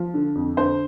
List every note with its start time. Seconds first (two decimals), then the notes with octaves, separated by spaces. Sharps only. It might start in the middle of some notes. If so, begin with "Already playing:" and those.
Already playing: F3
0.14 D3
0.35 F2
0.57 D3 C5